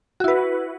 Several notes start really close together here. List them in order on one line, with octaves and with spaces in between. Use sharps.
F#4 E4 B4